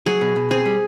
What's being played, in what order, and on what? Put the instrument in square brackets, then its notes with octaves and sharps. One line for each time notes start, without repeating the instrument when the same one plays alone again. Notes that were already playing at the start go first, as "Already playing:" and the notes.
[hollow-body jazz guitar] F#3 [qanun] G#4
[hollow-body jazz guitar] B2
B2
[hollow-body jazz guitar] C4 [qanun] G#4
[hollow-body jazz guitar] G3